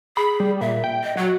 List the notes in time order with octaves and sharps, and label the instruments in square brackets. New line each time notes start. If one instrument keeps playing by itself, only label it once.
[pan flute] G#4 [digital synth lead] B5
[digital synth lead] G3
[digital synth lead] A#2 [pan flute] E5
[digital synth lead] G5
[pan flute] D#5
[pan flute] F#3 [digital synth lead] F#4